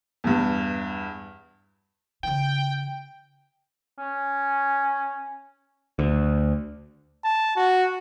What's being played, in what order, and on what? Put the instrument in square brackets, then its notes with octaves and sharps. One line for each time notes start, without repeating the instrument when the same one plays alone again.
[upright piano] E2 G2
[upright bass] C#3 E3 [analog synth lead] G5
[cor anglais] C#4
[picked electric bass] D2
[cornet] A5
F#4